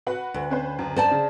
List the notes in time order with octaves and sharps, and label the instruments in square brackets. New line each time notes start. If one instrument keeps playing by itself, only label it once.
[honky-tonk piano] F#4 B4 F#5
[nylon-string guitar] D2
[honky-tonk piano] C#4 B4 C5
F#2
[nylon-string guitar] C5 D5 A5
[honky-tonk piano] C#3